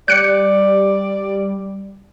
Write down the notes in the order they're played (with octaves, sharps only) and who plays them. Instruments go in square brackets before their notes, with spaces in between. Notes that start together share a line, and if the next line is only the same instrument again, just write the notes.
[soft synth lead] G3 [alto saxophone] D5 [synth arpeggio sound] F#6 C#7